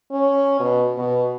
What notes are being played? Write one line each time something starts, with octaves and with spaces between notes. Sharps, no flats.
C#4
B2
B2